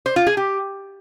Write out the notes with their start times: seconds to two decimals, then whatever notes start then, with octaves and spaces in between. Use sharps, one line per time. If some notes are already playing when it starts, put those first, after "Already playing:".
0.06 C5
0.16 F4
0.27 G#4
0.37 G4